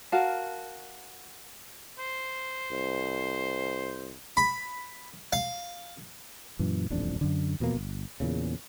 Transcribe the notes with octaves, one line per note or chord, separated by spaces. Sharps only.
F#4 A#4 F5 A5
C5
C2
B5
F5
F#2 A#2 E3
D#1 A1 F2 D4
F#2 D3
E2 B2 F3 A#3
G1
E2 A#2 C#3